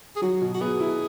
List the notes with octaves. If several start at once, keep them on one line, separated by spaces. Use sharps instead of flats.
G#4
F#3 F#4
B2
F#4
B3 G#4
E4